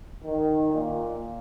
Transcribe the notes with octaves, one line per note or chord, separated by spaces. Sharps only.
D#3
A#2